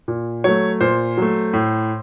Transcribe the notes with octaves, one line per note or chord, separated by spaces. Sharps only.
A#2
F#3 A3 C#5
A#2 C5
F#3 A3
A2